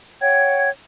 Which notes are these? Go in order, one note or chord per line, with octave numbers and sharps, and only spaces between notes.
C#5 F#5 G5 G#6